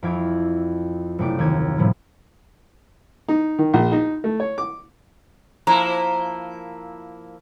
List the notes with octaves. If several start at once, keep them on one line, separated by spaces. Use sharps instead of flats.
F2 E4 F5 D6 G#6
F#1 C3 A3 D4 G5 D6
D#2 G#6
A2 C3 F3 G3
D#4
D#3
A#1
D#4
A3
C#5
D6
F3 A#3 E4 A#5